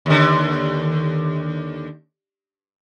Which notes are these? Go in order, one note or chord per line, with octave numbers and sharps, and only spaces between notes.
D#2 D3